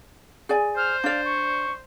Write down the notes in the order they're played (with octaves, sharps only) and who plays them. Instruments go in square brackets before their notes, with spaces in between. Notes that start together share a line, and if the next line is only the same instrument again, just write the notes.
[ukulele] G#4 D5 G#5
[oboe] C5 [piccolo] F6
[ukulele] D4 D5 [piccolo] F5
[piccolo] C#6